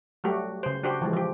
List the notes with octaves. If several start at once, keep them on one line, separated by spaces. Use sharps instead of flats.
F#3 G3 A3 F#4 G4
C#3 C5
D4 F#4 G4 C5
E3 F3 G#3
F3 G4